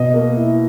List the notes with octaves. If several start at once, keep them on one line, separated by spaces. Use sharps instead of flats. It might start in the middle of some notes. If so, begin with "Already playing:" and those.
Already playing: B2 D#5
A#3
E4